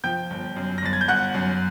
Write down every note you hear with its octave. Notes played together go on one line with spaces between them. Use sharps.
F3 G5 G6
G1
F#2
A#6
G1 A6
G#6
G6
G1 F#5 F#6
F#2